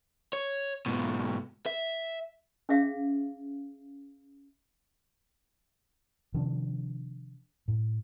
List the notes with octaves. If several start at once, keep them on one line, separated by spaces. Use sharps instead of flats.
C#5
G#2 B2
E5
C#4 G#4 E5 F5
C3 D#3 F3 D4
A2